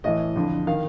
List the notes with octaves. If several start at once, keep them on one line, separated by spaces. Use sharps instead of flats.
A2 E3 D#5
F2 D3
D#3 F5